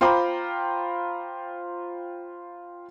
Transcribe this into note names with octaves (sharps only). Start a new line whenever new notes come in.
F4 C5 G5 A#5 B5 D6